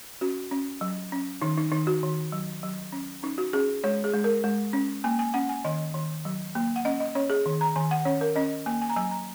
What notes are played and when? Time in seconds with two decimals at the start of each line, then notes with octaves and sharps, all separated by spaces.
0.21 C#4 F#4
0.51 C#4
0.81 F#3
1.12 C#4
1.41 D#3 D#4
1.58 D#4
1.72 D#3 D#4
1.87 F#4
2.03 D#3
2.32 F#3
2.63 F#3
2.93 C#4
3.23 C#4 D#4
3.38 F#4
3.53 C#4 G#4
3.84 G#3 C#5
4.04 G#4
4.14 G#3
4.24 A#4
4.44 G#3
4.73 C#4
5.04 A#3 G#5
5.19 G#5
5.34 C#4 F#5
5.49 G#5
5.65 D#3 D#5
5.94 D#3
6.25 F#3
6.55 A#3
6.76 F#5
6.85 C#4 D#5
7.00 D#5
7.15 C#4 C#5
7.30 G#4
7.46 D#3
7.61 A#5
7.76 D#3 G#5
7.91 F#5
8.05 C#4 C#5
8.21 A#4
8.36 C#4 D#5
8.66 A#3 G#5
8.82 G#5
8.89 A#5
8.96 F#3 G#5
9.11 A#5